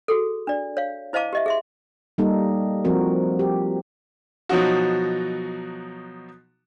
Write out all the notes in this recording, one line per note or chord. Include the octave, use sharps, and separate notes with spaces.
F#4 G#4 A4
D4 D5
C#5 F5
E4 C5 D#5 F5 A5 D6
G4 D#5 E5
G#4 E5 C6
G3 A#3 D#4 A4
F3 C4 F#4 A#4
G4
B2 F3 F#3 D#4 F#4